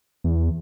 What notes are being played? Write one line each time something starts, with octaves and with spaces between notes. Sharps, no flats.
E2